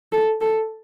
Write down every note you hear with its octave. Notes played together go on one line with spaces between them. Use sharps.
A4
A4